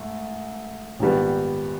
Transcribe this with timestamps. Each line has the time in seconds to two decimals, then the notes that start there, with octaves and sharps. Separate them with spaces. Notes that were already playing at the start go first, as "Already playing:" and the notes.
Already playing: G#2 A3
1.00 A#1 G#2 D#3 G3 B3